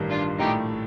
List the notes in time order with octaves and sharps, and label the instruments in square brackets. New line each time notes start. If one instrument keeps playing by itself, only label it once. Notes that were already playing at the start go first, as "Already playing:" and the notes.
Already playing: [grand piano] A1 G2 D#3 G3
[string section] D4 F4
[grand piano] A#1 A2 A3 [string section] D#4 G4